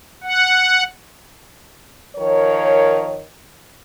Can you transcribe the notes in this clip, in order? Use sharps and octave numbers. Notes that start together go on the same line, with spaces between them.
F#5
D#3 F3 A#4 C#5